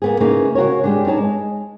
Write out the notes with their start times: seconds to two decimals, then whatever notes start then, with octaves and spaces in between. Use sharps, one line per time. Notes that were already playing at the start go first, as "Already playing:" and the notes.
0.02 A#3 B3 G#4
0.20 C#3 A#3 D#4 E4 B4
0.55 C#3 F#4 A#4 C#5
0.84 G3 G#3 D4
1.05 B3 D4 D#4 C#5 A5
1.17 G#3